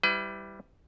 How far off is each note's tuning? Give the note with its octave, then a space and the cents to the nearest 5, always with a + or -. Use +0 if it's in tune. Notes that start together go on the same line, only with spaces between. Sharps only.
G3 +0 E4 +0 B4 +35